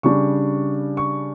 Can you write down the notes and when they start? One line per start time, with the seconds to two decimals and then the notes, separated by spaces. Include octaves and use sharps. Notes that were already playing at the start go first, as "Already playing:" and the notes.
0.03 C#3 G3 D4 C#6
0.97 C#6